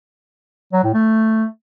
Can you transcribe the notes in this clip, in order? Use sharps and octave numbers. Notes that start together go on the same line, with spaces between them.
F#3
A2
A3